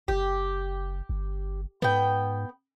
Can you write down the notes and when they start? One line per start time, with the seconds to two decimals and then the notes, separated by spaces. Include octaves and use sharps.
0.08 F#1 G4
1.09 G1
1.82 G#2 B3 G5